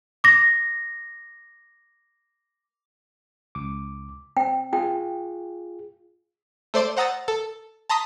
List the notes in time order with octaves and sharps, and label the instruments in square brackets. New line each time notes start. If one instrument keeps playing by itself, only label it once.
[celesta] D6 A#6
[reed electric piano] C#2 D6
[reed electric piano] C4 [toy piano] G5
[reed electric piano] F4 G#4 [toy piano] G5
[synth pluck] A3 C5 D5 C6 D7
C5 F#5 A#5 D#6 E6 A6
A4
A5 A#5 C6 D#6 B6